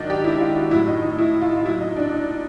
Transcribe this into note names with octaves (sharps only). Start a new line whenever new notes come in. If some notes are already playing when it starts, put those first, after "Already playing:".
Already playing: G#2 D#3 F#3 D4 D#4
G4
E4
E4
F4
F#4
A2 F#3 E4
D#4
D#4
E4
F4
F4
A#2 F#3 E4
D#4
D4
D#4